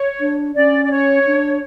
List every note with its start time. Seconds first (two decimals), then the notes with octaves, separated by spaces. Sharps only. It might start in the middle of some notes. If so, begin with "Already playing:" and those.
Already playing: C#5
0.20 D4
0.55 C#4 D5
0.85 D5
0.91 C#5
1.26 D4